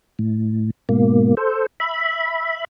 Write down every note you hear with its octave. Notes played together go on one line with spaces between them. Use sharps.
A2
G#2 B2 A#3
A4 C5
E5 B5